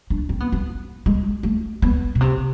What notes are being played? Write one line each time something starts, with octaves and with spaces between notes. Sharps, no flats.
D4
C4
B3
C4
G#3
A3
B3
B2
C3